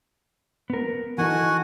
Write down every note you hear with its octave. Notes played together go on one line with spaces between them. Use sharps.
B3 A#4
E3 D#4 F#4 A4 F#5 G#5